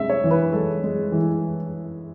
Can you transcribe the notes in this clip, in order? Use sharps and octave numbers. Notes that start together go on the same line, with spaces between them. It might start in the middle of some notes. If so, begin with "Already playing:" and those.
Already playing: C3 G#3 E5
C#5
E3
B4
G#3 A4
G#3
E3